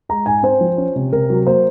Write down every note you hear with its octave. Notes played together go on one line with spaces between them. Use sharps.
G#3 A#5
G#2 G#5
C4 C5
F3
C#4
C3
C3 A#4
F#3
A#3 C5